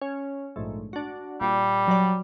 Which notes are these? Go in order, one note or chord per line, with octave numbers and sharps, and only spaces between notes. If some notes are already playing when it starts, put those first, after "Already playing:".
C#4
A#1 G#2 A3
D4 F#4
A#2 G3
F#3 D5